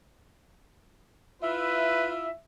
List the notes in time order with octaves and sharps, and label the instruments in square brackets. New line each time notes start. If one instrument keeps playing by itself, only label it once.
[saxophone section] E4 F4 [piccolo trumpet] B4 [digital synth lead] E5